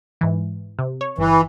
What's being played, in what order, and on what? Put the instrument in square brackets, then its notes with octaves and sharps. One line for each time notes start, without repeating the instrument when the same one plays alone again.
[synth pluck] G#2 E3
C3
C#5
[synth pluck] G1 [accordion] E3